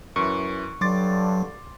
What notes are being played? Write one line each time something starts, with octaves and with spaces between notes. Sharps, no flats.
F#2 E3 C#6
G2 D3 F#3 C6 D6 A6